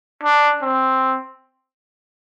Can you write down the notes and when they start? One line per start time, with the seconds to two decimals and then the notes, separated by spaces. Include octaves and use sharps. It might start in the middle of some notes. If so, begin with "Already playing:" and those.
0.23 D4
0.62 C4